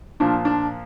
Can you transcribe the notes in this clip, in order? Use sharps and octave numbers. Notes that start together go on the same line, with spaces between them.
A#2 F3 D4
D4